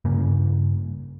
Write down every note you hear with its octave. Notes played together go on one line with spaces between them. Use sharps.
G2 C#3 A#3 C#4